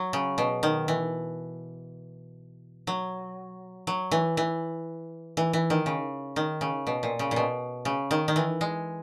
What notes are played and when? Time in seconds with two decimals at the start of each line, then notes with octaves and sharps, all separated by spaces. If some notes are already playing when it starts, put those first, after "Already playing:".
Already playing: F#3
0.13 C#3
0.38 B2
0.63 D#3
0.88 E3
2.87 F#3
3.87 F#3
4.11 E3
4.37 E3
5.37 E3
5.53 E3
5.70 D#3
5.86 C#3
6.36 D#3
6.61 C#3
6.87 B2
7.03 A#2
7.19 C#3
7.31 A#2
7.36 B2
7.85 C#3
8.11 D#3
8.28 D#3
8.36 E3
8.61 G#3